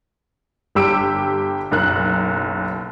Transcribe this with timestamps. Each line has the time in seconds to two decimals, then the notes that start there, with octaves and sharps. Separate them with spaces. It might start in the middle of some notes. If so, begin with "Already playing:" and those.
0.75 G1 G4 E6 D7
1.71 F#1 B1 A#4 F#6